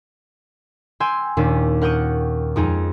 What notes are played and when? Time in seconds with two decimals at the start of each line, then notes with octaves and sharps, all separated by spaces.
1.00 G5 G#5 C6 E6
1.37 D#2 A#2 C#4 D4
1.81 A#4 F#5 G5 C#6 D#6
2.56 F2 G#3 D#4 G#4 A#5